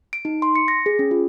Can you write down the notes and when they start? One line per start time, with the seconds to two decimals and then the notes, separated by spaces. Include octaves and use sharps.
0.13 D7
0.25 D#4
0.42 C6
0.56 C#7
0.68 A#6
0.86 G#4
0.99 C#4
1.11 F4